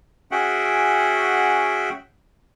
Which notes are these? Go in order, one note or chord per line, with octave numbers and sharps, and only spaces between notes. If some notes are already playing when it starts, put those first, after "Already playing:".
C#4 F#4 G#4 E5 F#5 G5